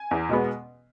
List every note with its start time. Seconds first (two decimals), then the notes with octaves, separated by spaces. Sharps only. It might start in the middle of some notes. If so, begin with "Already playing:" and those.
Already playing: G#5
0.11 E2
0.29 B2 G#3 B3